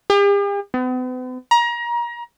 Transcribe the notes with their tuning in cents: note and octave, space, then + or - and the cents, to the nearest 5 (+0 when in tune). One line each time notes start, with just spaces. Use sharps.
G4 +45
B3 +45
A#5 +30